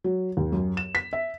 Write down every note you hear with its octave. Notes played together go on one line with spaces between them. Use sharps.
F#3
D#2
F#2
E7
B6
E5